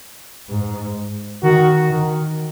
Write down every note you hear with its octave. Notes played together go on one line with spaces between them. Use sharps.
G#2
D#3 F#4
D#3